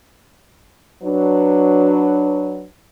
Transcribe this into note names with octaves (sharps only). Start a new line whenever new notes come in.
F#3 D4 B4